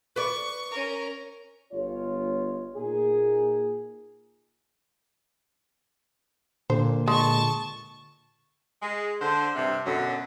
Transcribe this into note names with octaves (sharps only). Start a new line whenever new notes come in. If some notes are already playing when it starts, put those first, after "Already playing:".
B4 D5 C#6
C#4 A#4
G1 F4 C#5
A#2 A#3 D#4 G#4
A#2 D3 C5
G#3 A5 C#6
G#3
D3 C5
G2 C3
F#2 B2 D3 F#3